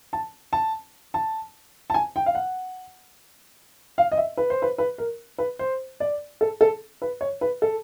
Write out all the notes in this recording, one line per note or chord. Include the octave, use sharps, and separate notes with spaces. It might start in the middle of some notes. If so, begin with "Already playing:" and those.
A5
A5
A5
A5
G#5
G5
F5
F#5
F5
D#5
E5
B4
C5
B4
B4
A#4
B4
C5
D5
A4
A4
B4
C#5
B4
A4